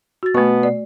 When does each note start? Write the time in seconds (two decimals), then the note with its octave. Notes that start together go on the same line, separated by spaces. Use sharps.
0.23 F#4 A6
0.34 B2 A3 B3 C#6
0.63 D5